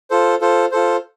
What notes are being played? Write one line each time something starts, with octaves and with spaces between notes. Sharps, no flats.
F4 A4 C5
F4 A4 C5
F4 A4 C5